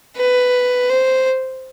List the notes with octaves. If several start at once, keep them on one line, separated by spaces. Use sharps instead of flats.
B4
C5